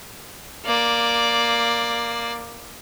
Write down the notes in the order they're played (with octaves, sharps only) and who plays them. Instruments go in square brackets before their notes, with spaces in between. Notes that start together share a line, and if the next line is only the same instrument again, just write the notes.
[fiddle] A#3 D5